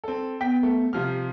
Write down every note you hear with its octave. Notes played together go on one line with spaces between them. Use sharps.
C4 A4
B3 G5 B6
A3
C3 F3 G4 F6